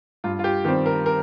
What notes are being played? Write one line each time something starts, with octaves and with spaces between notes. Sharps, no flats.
G2 F4
F4
G4
D#3 G3 C4 G4
A#4
A#4